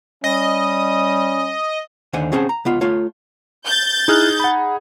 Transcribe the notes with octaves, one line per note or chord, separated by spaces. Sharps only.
G3 C#4 D#5
D#2 D3 C5 F#5 G#5
C4 C#4 G#4 C5 F#5 A5
A#5
C#2 B3 F4
A3 F4 C#5
G6 A6
D#4 E4 G#4 F6 F#6
F#5 B5